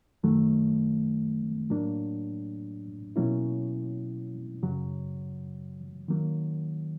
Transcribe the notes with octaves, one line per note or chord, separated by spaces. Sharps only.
F#2 D#3 F#3 A3
A2 F#3 A#3 D4
B2 F#3 A#3 C#4 E4
F#2 C#3 F#3
D#3 F#3 A#3